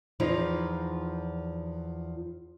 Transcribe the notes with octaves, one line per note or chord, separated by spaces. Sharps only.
E2 F3 D#4 F4